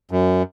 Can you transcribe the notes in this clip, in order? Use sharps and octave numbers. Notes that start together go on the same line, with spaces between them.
F#2